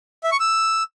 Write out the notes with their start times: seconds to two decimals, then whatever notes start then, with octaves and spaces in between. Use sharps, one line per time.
0.24 E5
0.32 C#6
0.40 E6